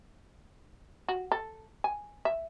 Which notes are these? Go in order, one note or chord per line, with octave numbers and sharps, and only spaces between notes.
F#4
A4
G#5
E5